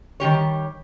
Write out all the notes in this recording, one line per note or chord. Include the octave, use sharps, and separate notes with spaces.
D#3 G3 G4 C#5